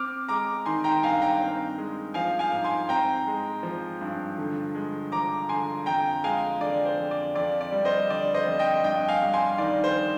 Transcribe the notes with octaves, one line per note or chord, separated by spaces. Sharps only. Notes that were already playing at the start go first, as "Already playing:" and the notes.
Already playing: C4 D6 F6
G#3 A#5 D6
D#3 G#5 C6
G5 A#5
G2 F5 G#5
G5 A#5
C4
G#3
F3 F5 G#5
F5 G#5
G#2
G#5 C6
C4 G5 A#5
G#3
F3
G2
D3
G#3
F3 A#5 D6
D3 G#5 C6
F2 G5 A#5
G#3 F5 G#5
D3 D5
C5
F2
D5
F2 D5
D5
G3
C5 D#5
D3 D5
C5 D#5
F2
D#5 G5
G2 D#5 G5
F5 G#5
G3
G#5 C6
D#3 D5
C5